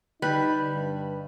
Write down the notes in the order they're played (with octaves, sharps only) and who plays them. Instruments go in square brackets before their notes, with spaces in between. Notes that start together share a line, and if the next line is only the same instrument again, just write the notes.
[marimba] D3 [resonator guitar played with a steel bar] G3 [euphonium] D#4 [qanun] B4
[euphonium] G2